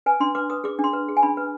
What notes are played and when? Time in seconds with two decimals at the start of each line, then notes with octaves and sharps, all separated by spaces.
0.06 B4 G#5
0.20 D4 C6
0.35 B4 D6
0.50 B4 D#6
0.64 G#4 D6
0.79 D4
0.84 C6
0.93 B4
1.09 G#4
1.17 G#5
1.23 D4 B5
1.37 B4